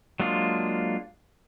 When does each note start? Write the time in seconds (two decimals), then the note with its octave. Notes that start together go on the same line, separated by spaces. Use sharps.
0.20 F#3 G#3 A#3 D4 F4